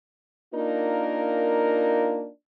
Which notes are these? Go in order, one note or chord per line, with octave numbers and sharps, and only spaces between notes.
A#3 D4 D#4 F4 A#4